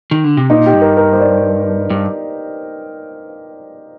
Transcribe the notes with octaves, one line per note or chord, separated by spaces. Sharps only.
D#3
D3
C3
A#2 D#4
G4
G2
A#4
A#4
C5
D5
G2